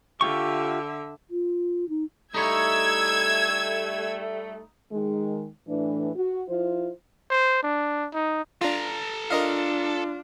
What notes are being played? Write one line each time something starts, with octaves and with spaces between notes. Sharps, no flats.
D3 F4 G4 E5 C#6
F4
D#4
G3 A3 D#4 E4 C#5 E6 G#6
D#3 G#3
A2 E3 D4
F#4
F3 E4 F4 C5
C5
D4
D#4
D4 F4 A4 A#5
D4 F4 A#4 D#5 F5